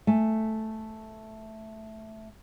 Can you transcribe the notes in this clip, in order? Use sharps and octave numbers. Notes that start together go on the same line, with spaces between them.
A3 G#5